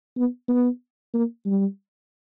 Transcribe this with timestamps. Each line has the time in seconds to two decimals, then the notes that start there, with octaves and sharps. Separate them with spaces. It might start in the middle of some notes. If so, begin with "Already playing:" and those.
0.17 B3
0.48 B3
1.14 A#3
1.46 G3